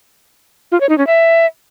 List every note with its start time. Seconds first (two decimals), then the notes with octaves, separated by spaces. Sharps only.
0.72 F4
0.80 C#5
0.89 D#4
0.98 C#4
1.07 E5